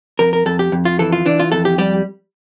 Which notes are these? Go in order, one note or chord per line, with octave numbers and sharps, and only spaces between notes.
F2 A#4
A#4
F2 A4
G4
F2
F4
E3 A4
F4
E3 D4
F4
F2 A4
G4
G3 G4